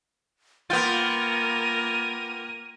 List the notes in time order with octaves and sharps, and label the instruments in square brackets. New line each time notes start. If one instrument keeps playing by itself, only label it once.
[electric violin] A#3 A#4 [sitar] B3 F4 [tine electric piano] G5 A6 [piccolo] D#7